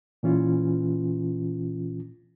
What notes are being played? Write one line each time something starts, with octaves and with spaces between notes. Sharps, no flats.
A#2 E3 C#4 F4